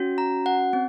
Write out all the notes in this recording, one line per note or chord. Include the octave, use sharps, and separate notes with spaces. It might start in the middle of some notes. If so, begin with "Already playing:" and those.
Already playing: C#4 F#4
A#5
F#5
C4